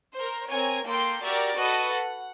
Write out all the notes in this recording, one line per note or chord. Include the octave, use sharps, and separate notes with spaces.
A#4 C5
C4 A#4 C#5 G#5
A#3 A4 G5 C6
F#4 G4 A#4 D5 E5
F#4 A4 B4 D#5
F#5